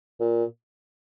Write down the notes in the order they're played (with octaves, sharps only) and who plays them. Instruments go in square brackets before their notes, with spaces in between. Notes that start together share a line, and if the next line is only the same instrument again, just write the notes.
[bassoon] A#2